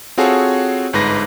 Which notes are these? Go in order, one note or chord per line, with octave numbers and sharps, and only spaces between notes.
C4 F4 F#4 G#4 A4 C#5
G1 G#2 B4 A#6